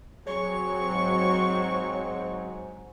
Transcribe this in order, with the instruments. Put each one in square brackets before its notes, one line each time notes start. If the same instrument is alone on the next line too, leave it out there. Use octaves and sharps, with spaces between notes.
[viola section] F#3 C4 [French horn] G#4 [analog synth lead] C#5 [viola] C#6
[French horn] G#2